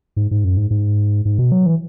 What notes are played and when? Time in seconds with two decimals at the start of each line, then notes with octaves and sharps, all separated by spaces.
0.17 G#2
0.31 G#2
0.44 F#2
0.57 G#2
0.71 G#2
1.25 G#2
1.39 B2
1.52 F#3
1.66 E3